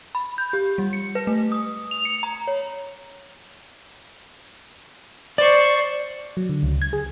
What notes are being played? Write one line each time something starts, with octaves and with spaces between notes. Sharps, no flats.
B5
G6
G4
G3
C#7
B4
A3
D#6
F7
C#7
A#5
C#5
C5 D5 C#6
F#3
D3
C#2
G#6
G#4